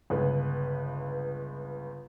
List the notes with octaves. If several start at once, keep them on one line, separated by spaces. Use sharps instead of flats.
G1 C#2 B4